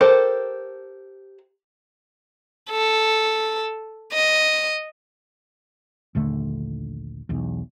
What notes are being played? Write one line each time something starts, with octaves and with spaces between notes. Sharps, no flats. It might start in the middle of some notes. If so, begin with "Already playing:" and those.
G4 A4 A#4 C5
A4
D#5
A#1 D#2 D3 A3
B1 E2